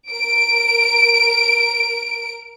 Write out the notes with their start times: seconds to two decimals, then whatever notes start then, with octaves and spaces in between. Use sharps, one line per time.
0.12 A#4 D7